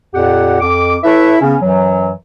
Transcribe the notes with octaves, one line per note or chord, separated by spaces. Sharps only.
F2 A#2 G4 F#5
F2 D6
E4 A4 B4 C#5 E5
C#3 B3 C#4
F#2 E3 F#3